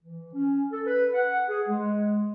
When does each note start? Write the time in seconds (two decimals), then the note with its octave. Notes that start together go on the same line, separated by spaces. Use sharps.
0.03 E3
0.34 C#4
0.72 A4
0.87 B4
1.14 F#5
1.48 G#4
1.68 G#3